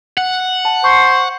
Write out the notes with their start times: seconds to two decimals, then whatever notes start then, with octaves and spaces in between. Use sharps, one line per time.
0.17 F#5
0.65 A5
0.84 C5 C#6